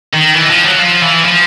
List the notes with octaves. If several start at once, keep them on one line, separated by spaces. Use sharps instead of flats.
D#3
E3
F3
F#3
F3
E3
F3